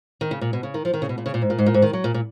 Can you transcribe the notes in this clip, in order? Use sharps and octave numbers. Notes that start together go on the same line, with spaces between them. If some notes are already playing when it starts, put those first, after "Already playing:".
D#3
C#3
A#2
B2
C#3
D#3
F3
D#3
C#3
B2
A#2
C#3
A#2
G#2
A#2
G#2
A#2
G#2
D#3
F#3
A#2
A#2